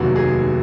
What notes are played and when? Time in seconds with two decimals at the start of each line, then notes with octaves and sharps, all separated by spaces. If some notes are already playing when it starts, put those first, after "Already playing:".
Already playing: F1 D#2 D#3 F#3 F#4
0.16 G#4